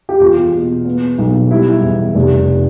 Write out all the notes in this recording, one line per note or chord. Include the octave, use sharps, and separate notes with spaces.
G4
E2 F4
B2
B3
B1
G3 E4
E2
F1